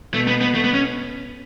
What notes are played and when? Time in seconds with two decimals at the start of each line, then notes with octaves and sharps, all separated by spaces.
0.14 B2 A3
0.27 B3
0.41 B3
0.55 A3
0.64 B3
0.73 C#4